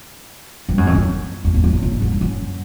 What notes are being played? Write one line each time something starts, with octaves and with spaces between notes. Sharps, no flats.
G2
F#2
F2
F#2
F2
E2
F2
F#2
A#2
A2
G#2
G2
F#2